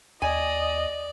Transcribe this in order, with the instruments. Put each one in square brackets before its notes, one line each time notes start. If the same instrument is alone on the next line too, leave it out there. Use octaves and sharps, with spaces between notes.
[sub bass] D#2 [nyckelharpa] D5 [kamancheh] D#5 [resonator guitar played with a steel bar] G#5